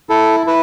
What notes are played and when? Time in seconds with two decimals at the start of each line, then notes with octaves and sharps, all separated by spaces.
0.10 E4 A4
0.47 E4 B4